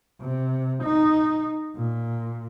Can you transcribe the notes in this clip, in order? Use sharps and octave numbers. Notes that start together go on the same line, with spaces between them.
C3
D#4
A#2